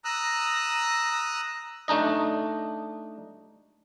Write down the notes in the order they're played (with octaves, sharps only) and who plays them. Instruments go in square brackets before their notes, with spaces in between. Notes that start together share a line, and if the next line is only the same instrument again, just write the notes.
[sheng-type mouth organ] A#5 D#6 E6 F#6
[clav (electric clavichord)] A3 D4 D#4 D#5